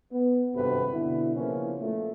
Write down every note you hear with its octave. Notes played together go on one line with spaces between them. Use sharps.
B3
G#1 G2 C3 F#4 A4 B4
B2 D3 E4
C#3 F3 A#3 B3 C#4 E4
A#2 A3